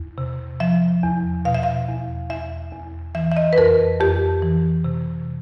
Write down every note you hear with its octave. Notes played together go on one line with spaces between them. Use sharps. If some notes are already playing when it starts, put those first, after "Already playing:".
Already playing: E2
C3
F3 E5
E2
B2 F5
E5
F5
E2
E2 E5
E2
E3 E5
E5
D#5
B4
F2 A#4
F2 G4
E3
C3